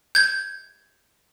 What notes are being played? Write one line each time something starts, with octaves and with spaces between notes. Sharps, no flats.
G6 G#6